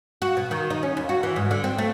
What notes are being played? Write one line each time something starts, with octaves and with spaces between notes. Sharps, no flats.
F#4
B2
D#3
D#4
C#4
D#2
F#4
E3
G#2
D3
C4
A3